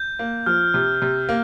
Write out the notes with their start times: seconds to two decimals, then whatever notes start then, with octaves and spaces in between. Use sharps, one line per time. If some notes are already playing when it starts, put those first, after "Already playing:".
Already playing: G6
0.19 A#3
0.46 F3 F6
0.74 C3
1.02 C3
1.29 A#3